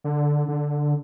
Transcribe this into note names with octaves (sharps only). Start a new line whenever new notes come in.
D3
D3